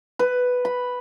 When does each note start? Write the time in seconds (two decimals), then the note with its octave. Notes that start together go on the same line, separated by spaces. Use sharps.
0.19 B4
0.65 B5